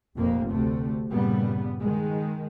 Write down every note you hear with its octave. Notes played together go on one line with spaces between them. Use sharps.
F1 A#1 F2 A#3
D2 C3 A3
G2 A#2 C#3 G3 B3
D#3 G#3